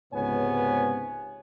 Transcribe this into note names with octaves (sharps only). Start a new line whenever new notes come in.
C#2 G#2 C3 B3 C#5 G#5